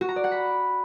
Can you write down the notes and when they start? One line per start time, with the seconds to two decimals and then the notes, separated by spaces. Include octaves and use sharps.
0.01 F#4
0.09 A#5
0.16 D5
0.24 F#5
0.31 B5